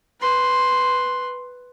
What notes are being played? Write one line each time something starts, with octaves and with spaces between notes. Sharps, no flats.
B4 C6